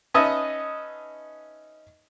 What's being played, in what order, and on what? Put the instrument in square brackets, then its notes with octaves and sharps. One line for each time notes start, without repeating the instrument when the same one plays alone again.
[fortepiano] C#4 D#4 B4 D#5 E5 A5